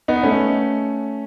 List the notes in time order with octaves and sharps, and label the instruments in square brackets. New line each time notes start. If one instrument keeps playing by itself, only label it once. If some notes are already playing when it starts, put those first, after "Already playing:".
[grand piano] B3 D#4
A3 C#4